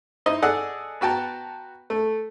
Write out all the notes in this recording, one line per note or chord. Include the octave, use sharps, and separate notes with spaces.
D#4 E4 C5 D#5
G#4 A4 D5 D#5 F#5 E6
B3 F#4 G5 A5 A#5
A3